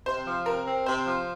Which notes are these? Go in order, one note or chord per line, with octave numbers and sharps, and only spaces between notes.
C3 C5
F3
C3 A#4
C4
C3 C5
F3